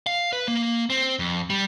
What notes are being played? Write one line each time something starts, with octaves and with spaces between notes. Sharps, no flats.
F5
B4
A#3
C4
F2
G3